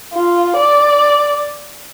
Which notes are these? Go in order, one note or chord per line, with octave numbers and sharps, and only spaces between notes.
F4
D5